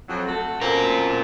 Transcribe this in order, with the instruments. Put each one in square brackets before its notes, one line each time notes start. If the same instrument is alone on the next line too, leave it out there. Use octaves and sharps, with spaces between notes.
[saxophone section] F2 F#3
A3 F#4 A4
[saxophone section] F#2 B2 C4 [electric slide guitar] F4 A#4